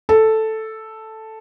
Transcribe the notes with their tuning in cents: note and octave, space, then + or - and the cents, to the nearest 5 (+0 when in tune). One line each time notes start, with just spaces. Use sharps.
A4 +0